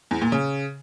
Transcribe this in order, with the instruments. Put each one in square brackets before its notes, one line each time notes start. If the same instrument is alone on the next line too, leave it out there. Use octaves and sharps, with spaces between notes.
[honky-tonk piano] E2
A#2
C#3